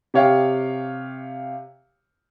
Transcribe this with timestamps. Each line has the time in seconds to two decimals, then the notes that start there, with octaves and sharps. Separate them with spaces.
0.14 C3 G4 C#5 F5 G5